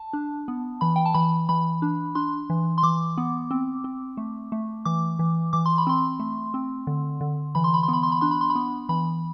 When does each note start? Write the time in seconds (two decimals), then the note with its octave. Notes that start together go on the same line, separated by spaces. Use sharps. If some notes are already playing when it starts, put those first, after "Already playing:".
Already playing: A5
0.13 D4
0.48 B3
0.81 E3 B5
0.96 G5
1.06 A5
1.14 E3 B5
1.49 E3 B5
1.82 D4
2.15 D4 C6
2.50 E3
2.78 C6
2.83 E3 D6
3.18 B3
3.51 C4
3.84 C4
4.17 A3
4.52 A3
4.85 E3 D6
5.19 E3
5.53 E3 D6
5.66 C6
5.78 B5
5.87 C4 C6
6.20 A3
6.54 C4
6.87 D3
7.21 D3
7.55 E3 B5
7.64 C6
7.74 B5
7.83 C6
7.88 B3 B5
8.03 C6
8.12 B5
8.21 D4 C6
8.31 B5
8.41 C6
8.50 B5
8.55 B3
8.89 E3 B5